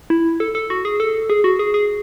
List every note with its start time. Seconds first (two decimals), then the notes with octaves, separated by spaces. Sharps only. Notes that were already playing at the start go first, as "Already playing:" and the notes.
0.10 E4
0.40 A4
0.55 A4
0.70 F#4
0.85 G#4
1.00 A4
1.30 G#4
1.44 F#4
1.59 G#4
1.74 G#4